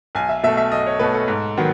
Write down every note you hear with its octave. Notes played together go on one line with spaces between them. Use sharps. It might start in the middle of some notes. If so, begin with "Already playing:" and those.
B1 G#5
E5
B2 A3 E5
E5
B1 D#5
C#5
B2 A3 B4
A4
G#2
D#3 F#3 B3